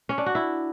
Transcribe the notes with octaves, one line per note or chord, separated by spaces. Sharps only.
C#4
D4
F#4
E4